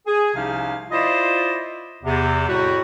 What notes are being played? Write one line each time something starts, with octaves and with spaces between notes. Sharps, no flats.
G#4
C2 C3 F3 C#4 D#4 F5
E4 F4 C5 D5 D#5
E2 C3
F2 A2 G3 F#4